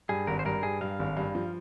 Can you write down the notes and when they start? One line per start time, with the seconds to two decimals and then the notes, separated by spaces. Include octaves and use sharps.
0.09 G2 G#4
0.27 G#1 A#4
0.39 C5
0.45 G2 A#4
0.63 G2 G#4
0.81 G2 F5
0.99 G#1
1.17 G2
1.35 F3